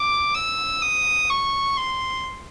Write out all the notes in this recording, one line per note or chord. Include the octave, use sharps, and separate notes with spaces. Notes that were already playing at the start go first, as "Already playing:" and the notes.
Already playing: D6
E6
D#6
C#6
C6